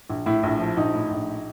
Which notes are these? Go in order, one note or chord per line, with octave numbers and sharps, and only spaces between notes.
A#1
A2 E4
A#1
F3
A#1 D#4
A2
A#1